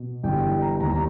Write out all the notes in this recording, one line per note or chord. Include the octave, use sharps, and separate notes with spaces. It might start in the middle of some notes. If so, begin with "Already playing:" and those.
Already playing: B2
G1 G2 E3 G5
A#5
D#2 D#3 A#5
A#5